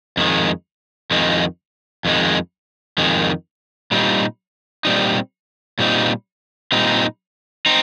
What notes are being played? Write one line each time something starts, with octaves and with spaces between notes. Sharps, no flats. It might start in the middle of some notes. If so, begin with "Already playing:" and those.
F2 D#3 G#3
F2 D#3 G#3
F2 D#3 G#3
F2 D#3 G#3
A#2 G3 C4 D#4
A#2 G3 C4 D#4
A#2 G3 C4 D#4
A#2 G3 C4 D#4
C4 D#4